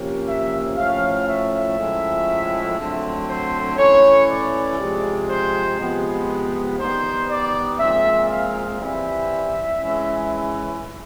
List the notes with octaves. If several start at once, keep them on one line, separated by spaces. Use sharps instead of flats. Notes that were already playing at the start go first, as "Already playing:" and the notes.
Already playing: C3 F3 A#3 C#4
E5
A2 F3 A3 C#4 F5
E5
A2 F3 G#3 C#4
D3 F#3 A3 C4
C5
E3 A3 C#4 C#5
D5
C3 F3 G#3 C4
C5
C3 F3 G#3 B3
D#3 G3 B3 C5
D5
A#2 F3 G#3 C4 E5
F5
E3 G3 C4 E5
E3 G#3 C#4